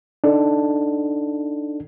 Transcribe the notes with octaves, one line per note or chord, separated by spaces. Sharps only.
D4 D#4 A4